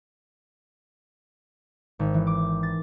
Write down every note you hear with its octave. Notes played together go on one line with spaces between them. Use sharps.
G#1
E3
D6
A6